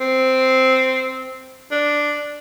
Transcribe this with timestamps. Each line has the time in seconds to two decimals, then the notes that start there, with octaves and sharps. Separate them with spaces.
0.01 C4
1.71 D4